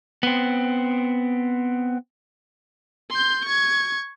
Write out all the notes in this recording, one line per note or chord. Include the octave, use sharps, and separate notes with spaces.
B3 C4
C6 G6
C#6 G#6